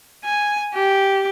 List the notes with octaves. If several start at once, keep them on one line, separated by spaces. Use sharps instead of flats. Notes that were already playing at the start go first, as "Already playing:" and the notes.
G#5
G4